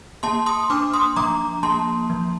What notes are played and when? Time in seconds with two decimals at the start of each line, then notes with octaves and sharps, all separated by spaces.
0.23 A#3 A5 C6
0.46 C6 D#6
0.70 D4 D6 F6
0.93 C6 D#6
1.16 F3 A#5 D6
1.63 A#3 A5 C6
2.10 F3